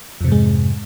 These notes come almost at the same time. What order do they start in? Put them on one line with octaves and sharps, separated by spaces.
F2 C3 G#2 G#3